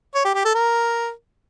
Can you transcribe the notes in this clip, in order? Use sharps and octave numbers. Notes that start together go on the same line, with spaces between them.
C#5
G4
G4
A4
A#4